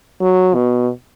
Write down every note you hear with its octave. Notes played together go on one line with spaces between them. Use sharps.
F#3
B2